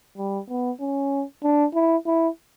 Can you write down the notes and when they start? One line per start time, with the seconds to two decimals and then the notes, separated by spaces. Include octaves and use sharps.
0.17 G3
0.49 B3
0.80 C#4
1.43 D4
1.75 E4
2.06 E4